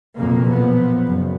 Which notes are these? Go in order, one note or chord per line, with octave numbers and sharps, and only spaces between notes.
B1 F2 C#3 A#3
A#2 F3 B3
F#1